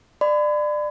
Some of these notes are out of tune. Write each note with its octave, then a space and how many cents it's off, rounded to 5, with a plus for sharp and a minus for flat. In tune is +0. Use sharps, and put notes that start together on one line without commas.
D5 +25 B5 +40